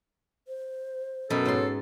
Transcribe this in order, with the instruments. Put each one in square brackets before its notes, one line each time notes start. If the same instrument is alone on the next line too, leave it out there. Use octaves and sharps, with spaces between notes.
[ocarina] C5
[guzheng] F#2 B2 [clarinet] A4
[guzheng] G#2 C6 [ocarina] C#5